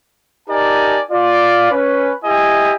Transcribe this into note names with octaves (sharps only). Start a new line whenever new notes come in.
D#4 G4 A#4 D5 G#5 A5
F4 D5
C#4 B4
E4 G4 D#5 E5 G#5